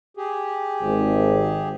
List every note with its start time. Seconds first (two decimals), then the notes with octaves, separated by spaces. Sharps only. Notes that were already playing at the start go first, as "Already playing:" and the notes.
0.17 G4 G#4
0.82 G#1